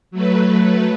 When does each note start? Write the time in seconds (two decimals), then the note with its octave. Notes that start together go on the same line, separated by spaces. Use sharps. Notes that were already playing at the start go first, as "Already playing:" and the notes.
0.11 F#3 A3 B4